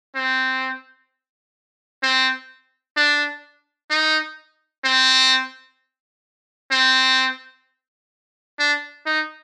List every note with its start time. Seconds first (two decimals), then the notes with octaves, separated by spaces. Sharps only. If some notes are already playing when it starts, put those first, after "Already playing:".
0.16 C4
2.03 C4
2.97 D4
3.90 D#4
4.85 C4
6.71 C4
8.59 D4
9.06 D#4